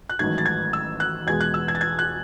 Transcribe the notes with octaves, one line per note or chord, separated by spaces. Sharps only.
F#6
A1 G#2 D#3 F#3 A3 G#6
A6
G#6
E6
F#6
E2 B2 G#3 G#6
F#6
E6
G#6
A6
G#6
F#6